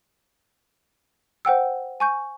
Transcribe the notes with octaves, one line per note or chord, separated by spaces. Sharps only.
C5 F#5 G5 E6
G#5 C#6 G6